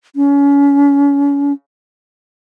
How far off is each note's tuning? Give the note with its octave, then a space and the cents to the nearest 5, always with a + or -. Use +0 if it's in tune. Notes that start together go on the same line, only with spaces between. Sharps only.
C#4 +30